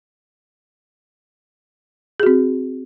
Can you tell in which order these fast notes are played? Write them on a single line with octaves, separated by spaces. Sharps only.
G#4 F#4 C4